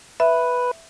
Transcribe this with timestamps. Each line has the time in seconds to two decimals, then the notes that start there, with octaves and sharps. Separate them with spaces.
0.20 B4 E5